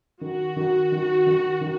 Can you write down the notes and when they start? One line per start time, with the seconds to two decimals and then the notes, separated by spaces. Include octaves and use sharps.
0.21 D#3 F#4
0.56 D#3
0.92 D#3
1.26 D#3
1.61 D#3